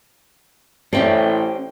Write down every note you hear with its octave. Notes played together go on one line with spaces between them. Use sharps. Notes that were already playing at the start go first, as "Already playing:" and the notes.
A1 C#4 E4 A4 C5 D5 G5